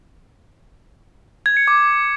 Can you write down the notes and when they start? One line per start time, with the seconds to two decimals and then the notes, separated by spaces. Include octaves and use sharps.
1.46 G#6
1.57 C#7
1.68 D6